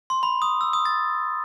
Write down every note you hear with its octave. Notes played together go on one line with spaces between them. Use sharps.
C6
B5
D#6
E6
D#6
A6